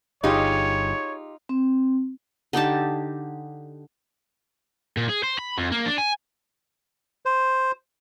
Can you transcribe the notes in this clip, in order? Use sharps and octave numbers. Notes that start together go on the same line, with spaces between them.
G1 D#4 F4 G4 G#4 C#5
C4
D3 D#4 G4 A5
A#2
G#4
C5
B5
F2
A#3
D4
G#5
C5